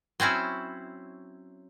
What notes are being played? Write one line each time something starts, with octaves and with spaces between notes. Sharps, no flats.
F#3 C4 C#4 E4